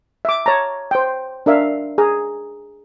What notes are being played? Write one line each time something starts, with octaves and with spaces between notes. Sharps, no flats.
E5 D6
C#5 A5 A#5
C5 G5
D4 A#4 E5 F5
G#4 A#5